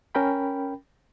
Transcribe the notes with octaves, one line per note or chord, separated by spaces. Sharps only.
C#4 A#4 G5 B5